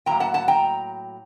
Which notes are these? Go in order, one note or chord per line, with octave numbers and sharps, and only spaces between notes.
A2 F#3 A#3 G5 A#5
F#5 A5
F#5 A5
G5 A#5